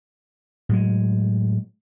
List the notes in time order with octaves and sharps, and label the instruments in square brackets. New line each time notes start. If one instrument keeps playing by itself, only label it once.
[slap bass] A2 F#3 G#3